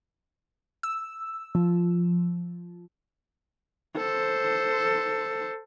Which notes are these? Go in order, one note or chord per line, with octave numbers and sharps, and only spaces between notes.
E6
F3
A4 C5